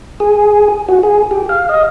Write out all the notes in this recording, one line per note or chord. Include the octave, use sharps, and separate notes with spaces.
G#4
F#4
G#4
G4
F5
D#5